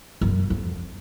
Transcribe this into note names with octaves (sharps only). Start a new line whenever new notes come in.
F#2
F2